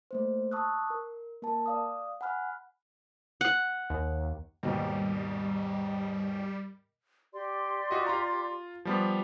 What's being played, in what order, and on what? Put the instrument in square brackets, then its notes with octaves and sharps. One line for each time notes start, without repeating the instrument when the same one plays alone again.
[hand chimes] A3 A#3 C5
A5 C#6 D#6 E6 F#6
A#4
A#3 A#4 A5
D5 F5 D#6
F#5 G#5 B5 F6 F#6
[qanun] F#5
[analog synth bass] D#2
[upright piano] D#2 G#2 B2 [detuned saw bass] G3
[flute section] G4 D5 C6
[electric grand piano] F4 F#4 D#5
F4 A#5
F3 G3 B3